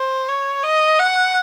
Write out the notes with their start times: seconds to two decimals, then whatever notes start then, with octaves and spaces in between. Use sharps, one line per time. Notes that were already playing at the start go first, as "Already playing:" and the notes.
Already playing: C5
0.28 C#5
0.63 D#5
0.99 F#5